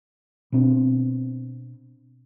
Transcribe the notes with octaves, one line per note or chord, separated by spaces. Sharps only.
B2 B3 C4 D4